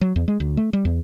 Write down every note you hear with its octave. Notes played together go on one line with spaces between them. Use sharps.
F#3
E2
G#3
D2
A3
G3
E2